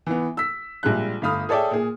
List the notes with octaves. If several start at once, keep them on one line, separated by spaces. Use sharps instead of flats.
E3 B3
E6 B6
A#1 G3 G#3 F4 F#6
G1 A3 F5 B5 D#6 F6
G#4 A4 C#5 D5 E5 G5
A#2 G#4